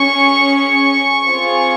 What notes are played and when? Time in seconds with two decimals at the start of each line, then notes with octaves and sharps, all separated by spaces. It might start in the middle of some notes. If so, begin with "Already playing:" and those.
Already playing: C#4 G#4 C#6
0.58 C#6
1.26 C4 F4 G#4